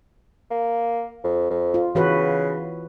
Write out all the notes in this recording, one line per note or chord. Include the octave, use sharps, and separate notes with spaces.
A#3
F2
F2
F4
C#3 E3 F#4 B4